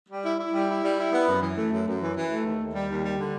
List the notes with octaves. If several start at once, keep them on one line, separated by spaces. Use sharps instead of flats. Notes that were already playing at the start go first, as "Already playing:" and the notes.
G3
E4
E4
G3
E4
G3
E4
B3
F#2
E3
A3
F#2
F#2
E3
E3
A3
D#2
D#2
G3
D#2
G3
D3